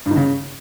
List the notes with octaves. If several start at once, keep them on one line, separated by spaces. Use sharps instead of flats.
G2
D#3
C#3